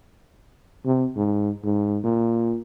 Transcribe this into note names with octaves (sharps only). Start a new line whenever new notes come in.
C3
G#2
G#2
A#2